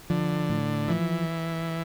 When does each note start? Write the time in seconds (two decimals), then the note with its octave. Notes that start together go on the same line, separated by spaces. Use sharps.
0.10 D3 F3
0.49 A2
0.88 E3 F3